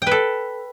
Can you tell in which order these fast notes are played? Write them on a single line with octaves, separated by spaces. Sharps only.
G5 B4 A4